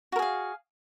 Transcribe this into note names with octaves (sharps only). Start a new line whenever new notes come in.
F#4 G#4 A#4 F5